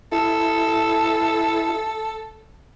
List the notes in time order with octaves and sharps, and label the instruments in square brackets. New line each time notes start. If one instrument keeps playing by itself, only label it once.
[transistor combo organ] E4 [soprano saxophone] A4